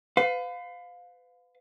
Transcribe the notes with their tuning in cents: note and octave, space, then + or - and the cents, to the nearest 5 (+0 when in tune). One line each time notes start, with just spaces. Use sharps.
B4 +40 F5 +20